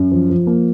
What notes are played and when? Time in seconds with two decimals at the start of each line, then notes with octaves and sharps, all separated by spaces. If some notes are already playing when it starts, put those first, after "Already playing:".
Already playing: F#2
0.11 F3
0.30 F3
0.47 A#3